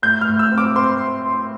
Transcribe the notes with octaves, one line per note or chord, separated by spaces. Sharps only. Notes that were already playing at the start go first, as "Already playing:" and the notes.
A2 G6
F6
A2
E6
C4
D6
C4 C6